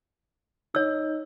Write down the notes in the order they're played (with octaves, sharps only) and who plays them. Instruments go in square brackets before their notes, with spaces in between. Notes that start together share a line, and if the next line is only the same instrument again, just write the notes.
[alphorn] D#4 [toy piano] C#5 E6